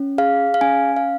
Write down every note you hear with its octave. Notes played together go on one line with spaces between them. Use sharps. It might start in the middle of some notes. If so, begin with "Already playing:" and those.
Already playing: C#4
G#4 F5
F5
C#4 G#5
F5